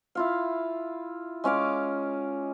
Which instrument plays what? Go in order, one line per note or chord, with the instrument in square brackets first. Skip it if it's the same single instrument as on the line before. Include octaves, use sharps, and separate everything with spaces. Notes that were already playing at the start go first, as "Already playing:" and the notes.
[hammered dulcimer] E4 F4 F5
G#3 C#4 F5 D6